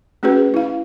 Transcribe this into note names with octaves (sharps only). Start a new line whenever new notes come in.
A3 C#4 F#4 G#4 B4
E4 F5